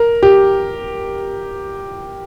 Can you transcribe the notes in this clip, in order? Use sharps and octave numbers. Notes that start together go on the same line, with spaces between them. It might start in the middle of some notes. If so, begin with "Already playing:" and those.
Already playing: A#4
G4